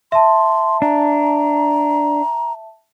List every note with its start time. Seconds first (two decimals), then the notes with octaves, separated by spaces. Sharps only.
0.12 E5 A5 C6
0.82 D4 A#5